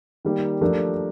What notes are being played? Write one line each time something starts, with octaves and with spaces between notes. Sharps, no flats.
D#3 G3 A#3
F3 A3 D4 G4 A#4